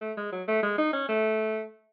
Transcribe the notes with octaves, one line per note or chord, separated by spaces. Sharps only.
A3
G#3
F#3
A3
G#3
D#4
C#4
A3